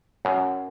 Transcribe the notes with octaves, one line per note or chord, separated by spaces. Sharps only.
F#2